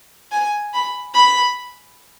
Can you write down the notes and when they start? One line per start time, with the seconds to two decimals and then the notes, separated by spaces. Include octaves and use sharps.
0.32 G#5
0.74 B5
1.14 B5